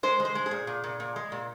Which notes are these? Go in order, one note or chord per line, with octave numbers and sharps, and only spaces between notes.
G#3 C5
G#3
C5
G#3
G#4
A#2
A#2
A#2
A#2
G#3
A#2